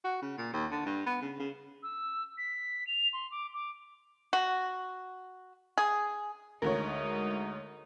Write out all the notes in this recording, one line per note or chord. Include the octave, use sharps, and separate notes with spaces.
F#4
C#3
A#2
D#2
D3
G2
B3
C#3
C#3
E6
B6
F7
C6
D6
D6
F#4
G#4
D2 D3 G#3 D#4 A#4 C#5